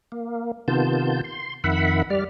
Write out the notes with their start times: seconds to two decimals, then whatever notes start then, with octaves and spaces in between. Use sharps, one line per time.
0.12 A#3
0.68 C3 D#3 B3 F4 A5 G6
1.24 C6
1.64 F2 D#3 E5 F#5 B5
2.10 G3 D5 F6